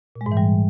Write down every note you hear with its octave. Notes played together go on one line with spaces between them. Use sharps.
A#2
G#3
G#2
E3
G3